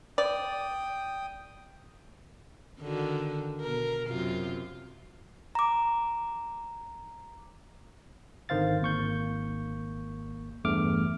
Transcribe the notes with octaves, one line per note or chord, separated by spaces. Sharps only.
D5 G5 D#6
D3 D#3 F#4
B2 A#4
F#2 C3 F4
A#5 D6
G#1 D3 D#3 C5 F5 A6
G#1 A#3 C#6 G6
E2 G2 A3 D6 F6